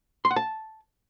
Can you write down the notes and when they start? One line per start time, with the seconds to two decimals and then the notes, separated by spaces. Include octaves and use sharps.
0.25 C6
0.31 F#5
0.36 A5